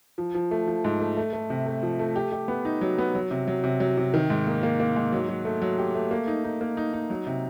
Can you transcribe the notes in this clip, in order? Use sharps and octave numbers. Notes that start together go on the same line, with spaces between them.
F3
F3
A3
F3
G#2
A3
A3
A3
C3
A3
F3
A3
G4
G4
B3
D#4
F#3
B3
F#3
C3
F#3
C3
F#3
C3
D#3
G#2
A#3
A#3
A#3
G#2
F#3
F#3
A3
F#3
G4
A3
A#3
D#4
D#4
A#3
D#4
D#4
F#3
C3